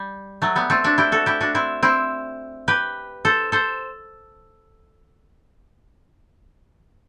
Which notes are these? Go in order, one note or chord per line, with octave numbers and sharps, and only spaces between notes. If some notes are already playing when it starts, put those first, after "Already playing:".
Already playing: G3
F#3 A3
G3 B3
A3 C4
D4 F#4
E4 G4
F#4 A4
E4 G4
D4 F#4
C4 E4
C4 E4
G4 B4
A4 C5
A4 C5